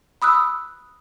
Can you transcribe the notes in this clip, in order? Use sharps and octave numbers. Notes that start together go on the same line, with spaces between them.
B5 D#6 E6 F#6